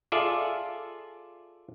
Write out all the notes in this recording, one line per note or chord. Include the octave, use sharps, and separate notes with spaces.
F4 G#4 A4 D5 E5 F5